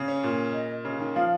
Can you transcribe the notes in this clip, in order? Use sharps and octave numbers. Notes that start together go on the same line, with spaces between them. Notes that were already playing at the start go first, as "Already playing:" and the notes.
Already playing: C#3
C#4
A#2
D#5
C#3
D#3
F3 F5